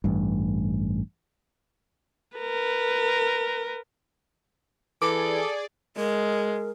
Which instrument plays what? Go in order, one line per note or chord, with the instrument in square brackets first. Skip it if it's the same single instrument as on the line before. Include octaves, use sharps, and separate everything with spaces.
[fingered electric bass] A1 G2
[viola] A#4 B4
[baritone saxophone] E3 [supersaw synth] G#4 D5 [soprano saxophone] A4 [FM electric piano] D6
[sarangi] G#3 [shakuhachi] A#4